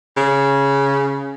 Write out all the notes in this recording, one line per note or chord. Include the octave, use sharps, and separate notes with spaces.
C#3